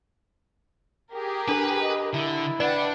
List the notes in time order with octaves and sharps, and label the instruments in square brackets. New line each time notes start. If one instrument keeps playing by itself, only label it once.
[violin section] G4 G#4 A#4
[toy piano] D4 A4 [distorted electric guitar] B4
[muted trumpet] D#5
[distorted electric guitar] D3 [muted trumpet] E4
[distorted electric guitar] D4 [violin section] B4 F#5 G5 [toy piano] D5